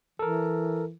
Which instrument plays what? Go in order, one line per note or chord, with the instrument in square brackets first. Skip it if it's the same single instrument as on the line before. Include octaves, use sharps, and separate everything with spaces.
[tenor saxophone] E3 [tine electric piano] A4 A#4